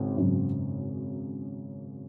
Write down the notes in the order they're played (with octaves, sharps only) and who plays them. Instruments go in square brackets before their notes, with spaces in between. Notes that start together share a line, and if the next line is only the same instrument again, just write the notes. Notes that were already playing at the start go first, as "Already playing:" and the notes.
Already playing: [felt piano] G#1 C#3
G#1 F#2 C#3